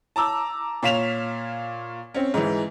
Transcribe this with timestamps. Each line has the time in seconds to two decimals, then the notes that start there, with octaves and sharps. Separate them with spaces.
0.16 A5 A#5 D6 E6
0.83 A#2 C#5 F5 B6 E7 F7
2.14 C4 C#4
2.34 G#2 E3